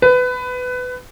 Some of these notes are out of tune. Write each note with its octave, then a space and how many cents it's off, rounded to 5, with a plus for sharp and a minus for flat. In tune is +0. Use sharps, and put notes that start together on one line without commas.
B4 +20